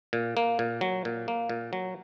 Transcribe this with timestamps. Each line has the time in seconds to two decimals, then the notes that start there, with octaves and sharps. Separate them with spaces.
0.13 A#2
0.37 A#3
0.59 A#2
0.81 F#3
1.05 A#2
1.28 A#3
1.50 A#2
1.73 F#3